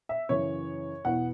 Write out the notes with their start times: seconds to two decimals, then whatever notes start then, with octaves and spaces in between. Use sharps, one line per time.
0.09 E5
0.29 F#2 C#3 E3 C#5
1.05 E2 B2 B3 E4 F#5